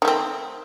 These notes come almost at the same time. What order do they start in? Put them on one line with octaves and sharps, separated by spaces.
D#3 A3 C4